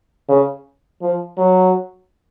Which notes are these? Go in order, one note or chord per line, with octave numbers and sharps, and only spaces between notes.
C#3
F3
F#3